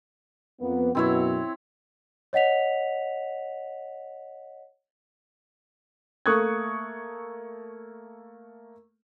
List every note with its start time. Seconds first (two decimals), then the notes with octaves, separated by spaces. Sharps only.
0.60 F2 A#3 B3
0.95 F#2 B2 C4 E4 C#5
2.33 C#5 D#5 F#5 B6 F7
6.26 A3 A#3 C#6 D#6 F#6 G#6